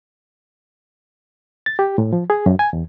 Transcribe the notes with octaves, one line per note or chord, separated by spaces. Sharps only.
A6
G4
A2
F3
G#4
F#2
G#5
E2